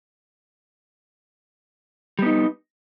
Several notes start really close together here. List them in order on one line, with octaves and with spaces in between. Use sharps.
G3 B3 D#4